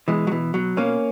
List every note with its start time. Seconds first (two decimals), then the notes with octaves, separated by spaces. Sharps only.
0.08 B2 E3 G#3
0.27 F#3
0.31 B2 E3
0.54 B2 F#3
0.77 B2 A#3 C#4